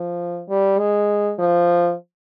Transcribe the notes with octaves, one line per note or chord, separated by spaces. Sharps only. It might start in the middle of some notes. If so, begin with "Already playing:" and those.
Already playing: F3
G3
G#3
F3